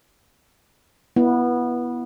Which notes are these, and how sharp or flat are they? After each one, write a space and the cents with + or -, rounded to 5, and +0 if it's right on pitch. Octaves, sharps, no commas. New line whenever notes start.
B3 -15 E4 +10